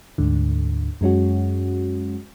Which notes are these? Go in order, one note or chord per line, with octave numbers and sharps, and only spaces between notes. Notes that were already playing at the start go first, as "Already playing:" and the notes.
D2 G#2 D3
F#2 G#3 C#4 F#4